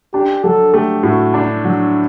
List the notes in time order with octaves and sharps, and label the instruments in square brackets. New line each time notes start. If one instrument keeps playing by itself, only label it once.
[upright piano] D4 [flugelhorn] G4
[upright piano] F#3 [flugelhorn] A4
[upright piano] A3 [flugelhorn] G4
[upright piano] A2 [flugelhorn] F#4
[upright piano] D4
F#3